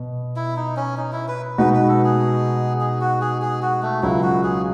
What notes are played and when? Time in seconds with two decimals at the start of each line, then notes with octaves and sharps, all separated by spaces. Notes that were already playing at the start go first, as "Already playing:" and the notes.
Already playing: B2
0.36 E4
0.56 D#4
0.77 C#4
0.97 D#4
1.12 E4
1.28 B4
1.58 B2 G#3 D#4 F#4 B4
1.74 B4
1.88 A4
2.04 G#4
2.81 G#4
3.01 F#4
3.21 G#4
3.42 G#4
3.62 F#4
3.82 A3
4.03 C#2 C#3 F#3 E4
4.23 F#4
4.44 G#4